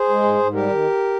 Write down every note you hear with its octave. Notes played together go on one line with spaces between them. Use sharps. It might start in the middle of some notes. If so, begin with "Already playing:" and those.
Already playing: G#4 C5
G#3
G#2
G#2
G3 G4 A#4
D#3